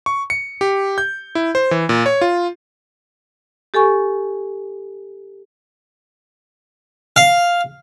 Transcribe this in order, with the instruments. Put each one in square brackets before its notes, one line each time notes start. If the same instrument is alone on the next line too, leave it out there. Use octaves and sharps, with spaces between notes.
[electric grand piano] C#6
C#7
G4
G6
E4
C5
E3
A#2
C#5
F4
[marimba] G4 A4 G#5 C#6
[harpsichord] F5